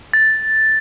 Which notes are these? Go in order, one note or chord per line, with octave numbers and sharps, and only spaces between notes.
A6